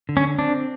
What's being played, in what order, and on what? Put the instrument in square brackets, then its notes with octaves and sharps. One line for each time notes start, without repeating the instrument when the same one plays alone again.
[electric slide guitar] D3
[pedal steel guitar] C#4
[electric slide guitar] C4 [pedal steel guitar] D4